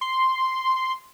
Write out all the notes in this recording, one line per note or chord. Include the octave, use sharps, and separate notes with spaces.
C6